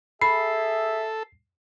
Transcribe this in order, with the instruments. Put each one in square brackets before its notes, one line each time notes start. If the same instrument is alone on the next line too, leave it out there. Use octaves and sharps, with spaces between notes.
[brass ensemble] G#4 E5 [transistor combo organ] A4 [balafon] B5 [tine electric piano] C7